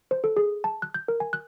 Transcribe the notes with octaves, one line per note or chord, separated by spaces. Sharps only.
C5
A4
G#4
A5
F#6
G6
A#4
G#5
F#6